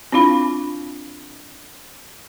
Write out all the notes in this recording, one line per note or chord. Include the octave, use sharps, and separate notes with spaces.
C4 D4 E4 F4 F5 B5